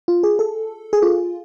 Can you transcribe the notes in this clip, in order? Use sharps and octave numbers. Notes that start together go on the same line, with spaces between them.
F4
G#4
A4
G#4
F4